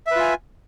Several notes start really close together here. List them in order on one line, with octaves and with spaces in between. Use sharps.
E5 B4 F4 G#5